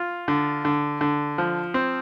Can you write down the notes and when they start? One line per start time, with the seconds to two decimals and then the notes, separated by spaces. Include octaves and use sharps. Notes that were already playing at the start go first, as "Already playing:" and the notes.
Already playing: F4
0.28 D3
0.65 D3
1.01 D3
1.38 F3
1.74 C4